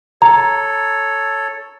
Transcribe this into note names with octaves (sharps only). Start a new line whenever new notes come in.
A4 C#5 A#5